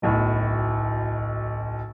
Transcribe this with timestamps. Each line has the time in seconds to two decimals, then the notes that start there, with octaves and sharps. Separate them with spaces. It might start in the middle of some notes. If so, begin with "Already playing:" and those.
0.02 D1 B1 A2